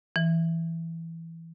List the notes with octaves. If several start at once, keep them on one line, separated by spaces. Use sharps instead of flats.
E3